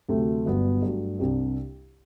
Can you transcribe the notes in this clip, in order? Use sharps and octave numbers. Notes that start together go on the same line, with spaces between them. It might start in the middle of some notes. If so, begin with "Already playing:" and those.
D2 C3 F#3 A3
G1 G2 F#3 B3 D4
G2 F#3 A3
C2 C3 G3 D4